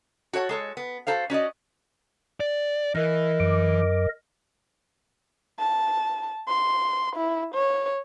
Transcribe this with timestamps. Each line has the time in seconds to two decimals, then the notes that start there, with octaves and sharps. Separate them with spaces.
0.33 F#4 A4 C#5 F#5
0.49 G#3 A4 C#5
0.77 B3
1.07 F#4 A4 C5 F5
1.30 C#4 F#4 D5 D#5
2.40 D5
2.95 E3 A#4 D#5
3.40 F#2 D6
5.59 A5
6.48 C6
7.16 E4
7.54 C#5